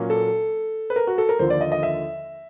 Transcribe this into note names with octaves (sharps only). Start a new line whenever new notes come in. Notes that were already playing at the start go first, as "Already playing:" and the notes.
Already playing: A#2 F#3 A#3 C#4
A4
B4
A#4
F#4
A4
A#4
D#2 D3 F3 A#3 C5
D5
D#5
D#5
E5